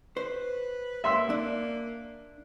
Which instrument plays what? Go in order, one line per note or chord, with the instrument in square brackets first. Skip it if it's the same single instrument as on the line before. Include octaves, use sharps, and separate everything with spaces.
[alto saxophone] B4 [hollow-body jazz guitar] C5
[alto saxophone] A#3 [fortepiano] E5 C6 E6
[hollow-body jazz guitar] D4